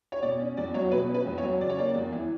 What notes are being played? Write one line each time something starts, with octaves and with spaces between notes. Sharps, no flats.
C#5
B2 D5
C#4
E2 D5
F#3 C#5
B2 B4
C#4
B4
E2
C#5
F#3
C#3 D5
C#5
A#3 D5
E2
E3